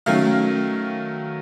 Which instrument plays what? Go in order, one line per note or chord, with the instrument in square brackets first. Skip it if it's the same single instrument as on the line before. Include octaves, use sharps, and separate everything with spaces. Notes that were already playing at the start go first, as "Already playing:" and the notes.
[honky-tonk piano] D#3 F#3 A3 C#4 F5